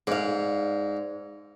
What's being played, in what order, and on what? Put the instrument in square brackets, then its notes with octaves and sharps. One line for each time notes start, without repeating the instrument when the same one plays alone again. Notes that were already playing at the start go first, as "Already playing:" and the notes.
[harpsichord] G#2 [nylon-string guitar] D5 F5